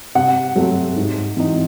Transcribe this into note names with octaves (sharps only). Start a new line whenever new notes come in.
C3 F#5
F#3 A3 C4
G#2
E3 C4 D#4